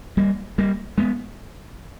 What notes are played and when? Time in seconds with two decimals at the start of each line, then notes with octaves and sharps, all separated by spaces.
0.17 G3 A#3
0.58 G3 A#3
0.98 G#3 B3